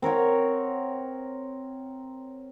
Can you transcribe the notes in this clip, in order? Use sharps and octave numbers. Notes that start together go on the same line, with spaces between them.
C4 A#4 C#5 F#5